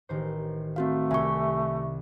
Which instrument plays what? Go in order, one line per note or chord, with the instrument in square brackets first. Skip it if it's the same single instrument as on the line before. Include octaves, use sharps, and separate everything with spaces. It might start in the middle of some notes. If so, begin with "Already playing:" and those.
[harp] A1 D#3 C5
[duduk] A3 [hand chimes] C4 F#4 F5
[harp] C2 G#5 B5 [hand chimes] E5 C#6